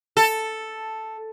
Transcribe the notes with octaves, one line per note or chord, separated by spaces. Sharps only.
A4